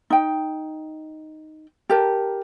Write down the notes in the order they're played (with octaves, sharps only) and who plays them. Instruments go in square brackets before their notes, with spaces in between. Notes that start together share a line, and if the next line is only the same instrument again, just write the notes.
[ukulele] D#4 G5
G4 A#4 A5